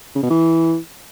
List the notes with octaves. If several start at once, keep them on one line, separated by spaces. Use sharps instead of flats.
C#3
B2
E3